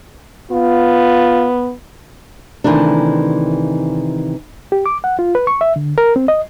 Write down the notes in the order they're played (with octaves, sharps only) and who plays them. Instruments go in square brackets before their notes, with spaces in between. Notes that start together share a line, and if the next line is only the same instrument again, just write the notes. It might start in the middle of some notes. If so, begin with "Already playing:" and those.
[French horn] B3 [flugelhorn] F4
[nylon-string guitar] C3 D#3 E3 A3 D4
[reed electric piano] G4
D6
F#5
F4
B4
C#6
E5
D3
A#4
C4
D#5